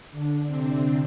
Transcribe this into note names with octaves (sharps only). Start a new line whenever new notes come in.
D3 D4
C3 C4